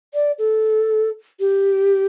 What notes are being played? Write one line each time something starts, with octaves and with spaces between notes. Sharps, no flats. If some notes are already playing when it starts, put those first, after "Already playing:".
D5
A4
G4